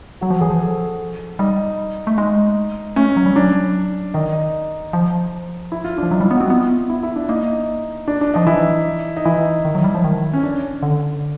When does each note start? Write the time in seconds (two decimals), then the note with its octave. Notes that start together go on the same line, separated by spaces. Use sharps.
0.21 F#3 F#4
0.31 F3
0.41 E3 G#4
0.50 F3
0.60 A4
1.39 G3 D#4
2.07 A3
2.17 G#3 D#4
2.96 A3 C#4
3.17 F#3
3.26 G3
3.36 F#3 D4
4.14 D#3 D#4
4.93 F3
5.72 E4
5.84 F4
5.98 D4
6.03 F3
6.11 F#3 D#4
6.21 G3 E4
6.31 B3
6.37 C4 F#4
6.50 B3 F4
6.90 E4
7.03 E4
7.16 D4
7.29 A#3 D#4
8.08 D4
8.21 D4
8.34 F3 D#4
8.47 E3 E4
9.17 D#4
9.25 E3 E4
9.65 D#3
9.75 F#3
9.84 G3
9.95 F3
10.04 D#3
10.33 C#4
10.43 D4
10.83 D3